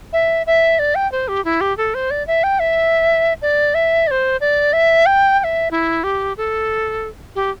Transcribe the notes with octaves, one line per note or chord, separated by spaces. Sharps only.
E5
E5
D5
G5
C5
G4
E4
G4
A4
C5
D5
E5
G5
E5
D5
E5
D5
C5
D5
E5
G5
G5
E5
E4
G4
A4
G4